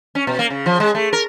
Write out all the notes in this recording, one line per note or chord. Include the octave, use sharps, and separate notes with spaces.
C#4
B2
A#3
C#3
F3
G#3
A3
A#4